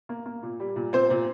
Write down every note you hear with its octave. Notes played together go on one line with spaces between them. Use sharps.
A#3
A#3
A#2
G3
A#2
A#2 C4 C5
A#2